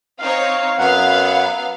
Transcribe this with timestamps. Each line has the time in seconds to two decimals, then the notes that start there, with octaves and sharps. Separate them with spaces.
0.19 C4 D#4 C#5 F5
0.78 F#2 F#3 B3 F5 F#5